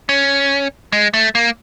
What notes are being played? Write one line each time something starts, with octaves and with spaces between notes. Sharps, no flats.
C#4
G#3
A3
A#3